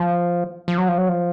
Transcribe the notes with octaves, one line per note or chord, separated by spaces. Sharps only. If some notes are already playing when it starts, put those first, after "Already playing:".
Already playing: F3
F3
F#3
F3
F#3
F3